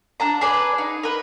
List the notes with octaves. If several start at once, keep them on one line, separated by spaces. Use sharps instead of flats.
D4 A5 A#5
G#4 B4 D5
D#4
A#4 B4